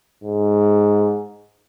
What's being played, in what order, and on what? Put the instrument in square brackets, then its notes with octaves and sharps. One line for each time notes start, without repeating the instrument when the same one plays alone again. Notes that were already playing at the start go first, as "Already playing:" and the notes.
[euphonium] G#2